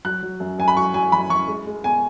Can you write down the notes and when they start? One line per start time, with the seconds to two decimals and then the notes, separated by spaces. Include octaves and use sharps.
0.05 F#3 F#6
0.23 F#3
0.40 F#2
0.59 F#2 G#5
0.68 B5
0.76 F#3 C#6
0.94 F#3 G#5
1.12 F#2 B5
1.30 F#2 C#6
1.48 G#3
1.67 G#3
1.84 B2 G#5